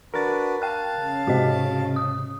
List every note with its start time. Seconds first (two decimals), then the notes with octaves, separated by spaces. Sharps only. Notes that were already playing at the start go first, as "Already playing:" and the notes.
0.14 D4 F#4 A#4 B4 A6
0.62 F5 G5 A5 F#6
0.97 C#3
1.27 G#2 C3 F#4 D#5
1.96 D#6